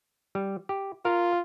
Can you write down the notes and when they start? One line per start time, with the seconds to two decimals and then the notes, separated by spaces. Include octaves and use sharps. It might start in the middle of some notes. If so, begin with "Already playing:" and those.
0.35 G3
0.69 G4
1.05 F4 A#4 F5